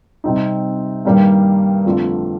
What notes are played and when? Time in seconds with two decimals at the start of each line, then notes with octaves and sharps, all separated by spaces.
0.24 C3 G3 C4 D#4
1.05 G2 D#3 G3 A#3
1.85 F2 D3 F3 A3